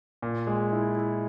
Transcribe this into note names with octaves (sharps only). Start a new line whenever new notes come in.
A#2
G#3
E4
E4